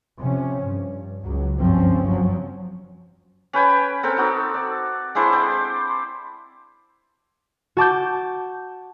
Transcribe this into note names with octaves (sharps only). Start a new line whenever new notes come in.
C3 F3 C#4
G2
C#2 F#3
F#1 G2 F3 C4 C#4
F3 F#3
C#4 B4 G5 G#5
C4 A4 A#4 G5
D#4 F#4 A4
D5
G#3 D4 E4 C5
C5 D5 G5
F#4 A5 D6 G6